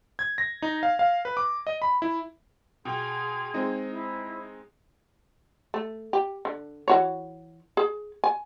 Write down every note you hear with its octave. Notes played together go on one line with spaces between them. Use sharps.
G#6
A#6
D#4
F5
F5
B4
D6
D#5
B5
E4
B2 G#4 G5 C6 G#6
G#3 C4 D#4
E4 C5
A3
G4
D3
E3 F#4 C#5
G#4
G#5